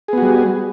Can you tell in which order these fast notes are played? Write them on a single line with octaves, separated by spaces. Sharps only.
G#4 B3 F#4 G3